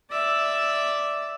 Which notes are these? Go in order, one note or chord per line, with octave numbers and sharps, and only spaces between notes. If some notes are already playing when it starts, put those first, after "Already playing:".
D5 E5